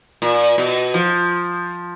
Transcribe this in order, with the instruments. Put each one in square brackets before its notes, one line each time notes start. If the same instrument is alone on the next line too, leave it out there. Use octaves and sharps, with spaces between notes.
[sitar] A#2
B2
F3